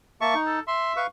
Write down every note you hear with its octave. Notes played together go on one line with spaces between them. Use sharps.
A#3 E5 A5 C#6
D#4
A4
E5 C6
B4 F5 C#6